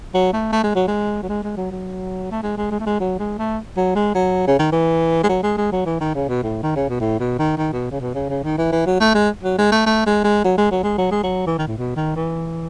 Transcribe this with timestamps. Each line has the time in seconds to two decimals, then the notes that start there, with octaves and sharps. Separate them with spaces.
0.14 F#3
0.33 A3
0.52 A3
0.63 G#3
0.75 F#3
0.87 G#3
1.23 F#3
1.29 G#3
1.43 G#3
1.57 F#3
1.71 F#3
2.31 A3
2.43 G#3
2.57 G#3
2.71 G#3
2.80 A3
2.86 G#3
3.00 F#3
3.19 G#3
3.38 A3
3.77 F#3
3.95 G#3
4.15 F#3
4.47 C#3
4.59 D#3
4.72 E3
5.23 G#3
5.29 F#3
5.43 G#3
5.57 G#3
5.72 F#3
5.85 E3
6.00 D#3
6.15 C#3
6.28 B2
6.43 A2
6.63 D#3
6.76 C#3
6.89 B2
7.00 A2
7.19 B2
7.38 D#3
7.57 D#3
7.73 B2
7.91 C#3
8.00 B2
8.14 C#3
8.29 C#3
8.43 D#3
8.58 E3
8.72 E3
8.86 F#3
9.00 A3
9.14 G#3
9.43 F#3
9.58 G#3
9.71 A3
9.86 A3
10.06 G#3
10.24 G#3
10.44 F#3
10.58 G#3
10.71 F#3
10.83 G#3
10.98 F#3
11.11 G#3
11.23 F#3
11.46 E3
11.58 D#3
11.67 A2
11.78 B2
11.96 D#3
12.16 E3